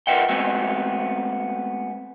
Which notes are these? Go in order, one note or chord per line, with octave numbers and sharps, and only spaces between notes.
F4 A#4 B4 E5 F#5 G5
G#3 A3 B3 C4 F#4 E5